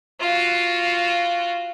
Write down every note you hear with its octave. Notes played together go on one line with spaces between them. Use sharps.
F4 F#4